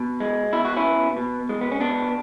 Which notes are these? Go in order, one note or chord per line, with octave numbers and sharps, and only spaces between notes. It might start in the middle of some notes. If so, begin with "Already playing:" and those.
Already playing: B2
G#3
B2 E4
F#4
C#4 E4
B3
B2
G#3
B3
C#4
B2 B3 D4